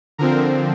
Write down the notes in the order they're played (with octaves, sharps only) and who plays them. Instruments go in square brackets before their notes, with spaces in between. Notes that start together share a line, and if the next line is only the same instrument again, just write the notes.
[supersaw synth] D3 F3 C4 A#4